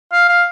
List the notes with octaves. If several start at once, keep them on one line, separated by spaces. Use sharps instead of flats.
F5
F5